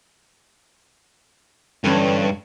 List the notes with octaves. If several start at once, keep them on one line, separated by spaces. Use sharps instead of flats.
G2 D3 E3 C#4